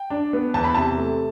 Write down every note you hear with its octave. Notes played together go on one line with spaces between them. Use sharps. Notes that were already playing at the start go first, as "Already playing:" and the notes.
Already playing: G5
D4
B3
E2 A5
B5
C3 A5
A3